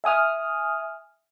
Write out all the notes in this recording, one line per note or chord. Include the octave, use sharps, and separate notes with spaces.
E5 G#5 D#6 F6